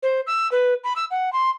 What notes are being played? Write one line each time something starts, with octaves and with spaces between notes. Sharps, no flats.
C5
E6
B4
B5
E6
F#5
C6